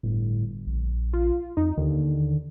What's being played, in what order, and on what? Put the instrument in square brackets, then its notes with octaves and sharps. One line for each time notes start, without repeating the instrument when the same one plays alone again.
[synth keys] G1 [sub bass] A2
[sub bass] A#1
[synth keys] F4
[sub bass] F2 [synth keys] D#4
[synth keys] D#2 [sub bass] D3